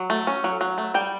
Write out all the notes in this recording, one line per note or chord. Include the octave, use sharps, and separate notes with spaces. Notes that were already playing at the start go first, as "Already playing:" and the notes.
Already playing: F#3
A3
C#4
F#3
F#3
A3
G3 G5